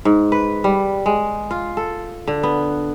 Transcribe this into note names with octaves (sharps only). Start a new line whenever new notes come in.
G#2
B4
G3
G#3
F4
A4
D3
B3